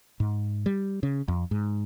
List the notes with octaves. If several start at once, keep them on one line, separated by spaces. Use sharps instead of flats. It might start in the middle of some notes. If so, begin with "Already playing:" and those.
G#2
G3
C#3
F2
G#2